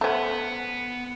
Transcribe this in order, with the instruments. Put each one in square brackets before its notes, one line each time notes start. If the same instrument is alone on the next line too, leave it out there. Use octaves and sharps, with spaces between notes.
[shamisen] A3 C#4 [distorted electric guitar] B3 [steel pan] A4 C5 F#5